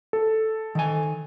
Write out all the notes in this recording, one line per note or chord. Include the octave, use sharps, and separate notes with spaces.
A4
D#3 G#5